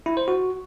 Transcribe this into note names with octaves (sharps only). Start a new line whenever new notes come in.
E4
C5
F#4